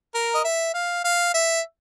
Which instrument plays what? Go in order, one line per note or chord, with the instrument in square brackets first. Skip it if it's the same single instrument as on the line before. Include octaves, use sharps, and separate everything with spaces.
[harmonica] A#4
D#5
E5
F5
F5
E5